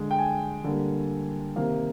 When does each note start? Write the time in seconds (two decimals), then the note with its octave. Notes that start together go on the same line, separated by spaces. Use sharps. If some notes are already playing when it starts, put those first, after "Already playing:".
Already playing: D3 G#3
0.11 G5
0.19 G#5
0.64 D3 G3 A#3
1.56 C3 D#3 A#3 F5